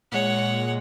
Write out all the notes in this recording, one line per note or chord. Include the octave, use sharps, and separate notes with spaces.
A#2 G#3 C#5 F#5